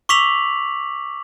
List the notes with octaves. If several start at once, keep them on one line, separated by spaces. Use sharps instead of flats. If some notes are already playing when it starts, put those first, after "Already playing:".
C#6 D6 E6 B6 F7 F#7